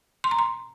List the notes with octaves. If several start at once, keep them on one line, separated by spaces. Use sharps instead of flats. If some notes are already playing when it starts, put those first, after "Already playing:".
C6
A#5
C6